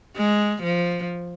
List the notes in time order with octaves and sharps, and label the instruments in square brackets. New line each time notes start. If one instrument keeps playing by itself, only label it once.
[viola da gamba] G#3
F3